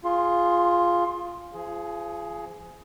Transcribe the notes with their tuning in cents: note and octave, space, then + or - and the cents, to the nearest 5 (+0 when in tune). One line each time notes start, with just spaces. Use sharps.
F4 +0 G#4 +0 C6 +25
F3 -30 G#4 +10